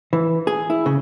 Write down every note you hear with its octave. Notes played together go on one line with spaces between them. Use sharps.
E3
G#4
E4
C#3